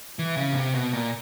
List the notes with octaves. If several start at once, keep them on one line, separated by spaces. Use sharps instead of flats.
E3
C#3
B2
C3
B2
A#2